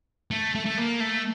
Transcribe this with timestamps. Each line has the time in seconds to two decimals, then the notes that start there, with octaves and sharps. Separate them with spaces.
0.31 A3
0.55 A3
0.66 A3
0.78 A#3
1.00 A3